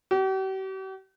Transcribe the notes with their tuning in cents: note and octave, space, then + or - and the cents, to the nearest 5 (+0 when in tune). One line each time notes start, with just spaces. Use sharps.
G4 -45